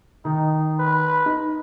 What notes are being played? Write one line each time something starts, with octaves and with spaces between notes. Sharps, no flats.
D#3 D#4
B4
D#4